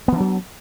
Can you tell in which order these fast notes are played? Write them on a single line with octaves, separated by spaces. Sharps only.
B3 E3 D4 F#3